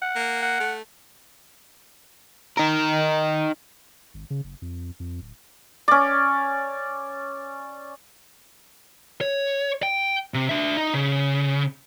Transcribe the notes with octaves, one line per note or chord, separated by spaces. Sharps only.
F#5
A#3
F#5
A3
D#4 A#4
G#1
C#3
F#1
F2
F2
D1
C#4 D5
C#5
G5
C3
D4 E5
D#4
C#3